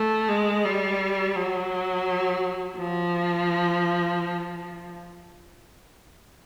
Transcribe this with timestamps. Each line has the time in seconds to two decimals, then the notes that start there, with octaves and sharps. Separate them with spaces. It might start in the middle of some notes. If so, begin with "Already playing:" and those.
Already playing: A3
0.29 G#3
0.65 G3
1.35 F#3
2.77 F3